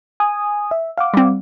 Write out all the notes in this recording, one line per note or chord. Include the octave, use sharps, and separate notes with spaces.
G#5 D#6
E5
F5 F#5 D6
G3 C4